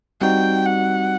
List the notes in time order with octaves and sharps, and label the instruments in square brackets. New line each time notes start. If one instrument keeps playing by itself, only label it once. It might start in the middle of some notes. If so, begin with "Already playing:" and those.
[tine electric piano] G3 C4 D#4 F#4 [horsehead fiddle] G5
[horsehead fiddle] F#5